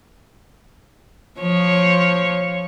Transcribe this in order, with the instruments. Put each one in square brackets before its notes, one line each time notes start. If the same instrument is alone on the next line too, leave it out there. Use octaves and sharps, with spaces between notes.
[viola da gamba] F3 C#5